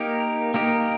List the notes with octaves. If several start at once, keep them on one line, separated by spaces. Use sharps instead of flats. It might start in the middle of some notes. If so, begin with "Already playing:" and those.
Already playing: A#3 D#4 G4 A#4
A#3 D#4 G4 A#4